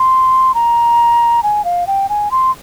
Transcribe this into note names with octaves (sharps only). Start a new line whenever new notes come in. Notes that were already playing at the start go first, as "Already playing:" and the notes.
Already playing: C6
A#5
G#5
F5
G5
G#5
C6